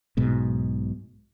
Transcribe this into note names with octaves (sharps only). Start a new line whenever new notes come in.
B1 G#2 B2